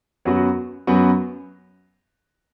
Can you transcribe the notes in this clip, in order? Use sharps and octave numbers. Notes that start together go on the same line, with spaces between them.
F#2 F#3 B3 F#4
F#2 F#3 B3 F#4